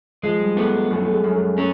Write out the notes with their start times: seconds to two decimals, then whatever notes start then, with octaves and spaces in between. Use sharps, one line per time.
0.23 F3 G#3
0.40 G3
0.56 A3 B3
0.90 F#2 A3
1.02 A3
1.12 G#3
1.24 F#2
1.35 G#3
1.58 A3 C#4